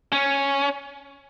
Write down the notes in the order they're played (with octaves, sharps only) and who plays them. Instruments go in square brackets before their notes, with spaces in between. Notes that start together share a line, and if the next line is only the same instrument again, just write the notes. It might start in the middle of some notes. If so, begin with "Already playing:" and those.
[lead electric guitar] C#4